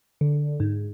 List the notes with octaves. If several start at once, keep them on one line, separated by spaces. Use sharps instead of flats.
D3
G#2